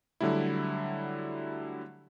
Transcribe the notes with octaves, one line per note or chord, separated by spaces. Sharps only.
D3 F#3 G3 A3 E4